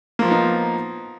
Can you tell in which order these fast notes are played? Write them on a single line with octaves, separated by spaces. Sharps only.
A#3 F3 F4 B3 D#4